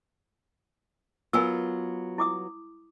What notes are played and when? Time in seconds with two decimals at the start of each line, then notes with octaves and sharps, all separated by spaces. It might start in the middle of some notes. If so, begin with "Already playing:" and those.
1.33 F#3 B3 F4 A#4 G#5 E6
2.18 E4 D6 D#6